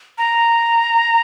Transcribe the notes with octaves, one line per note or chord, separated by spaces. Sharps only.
A#5